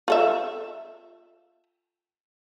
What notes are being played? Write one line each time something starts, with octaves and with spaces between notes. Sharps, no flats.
F4 A4 E5